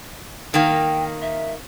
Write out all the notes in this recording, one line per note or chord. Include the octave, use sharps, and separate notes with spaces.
D#3 A#3 G5
E5